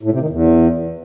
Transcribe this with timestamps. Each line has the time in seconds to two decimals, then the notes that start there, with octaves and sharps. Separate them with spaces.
0.03 A2
0.12 C3
0.21 D#3
0.30 E2